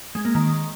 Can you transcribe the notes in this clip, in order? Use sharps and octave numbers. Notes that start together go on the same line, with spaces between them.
G#3
A#3
D#3